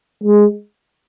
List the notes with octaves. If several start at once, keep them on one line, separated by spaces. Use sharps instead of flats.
G#3